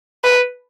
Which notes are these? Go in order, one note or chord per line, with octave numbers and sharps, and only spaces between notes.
B4